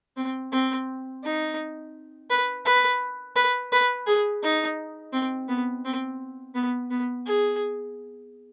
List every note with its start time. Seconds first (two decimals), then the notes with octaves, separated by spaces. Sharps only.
0.17 C4
0.52 C4
1.24 D#4
2.30 B4
2.65 B4
3.36 B4
3.72 B4
4.07 G#4
4.43 D#4
5.13 C4
5.48 B3
5.85 C4
6.55 B3
6.91 B3
7.27 G#4